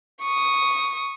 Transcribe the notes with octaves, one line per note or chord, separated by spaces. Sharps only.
C#6 D#6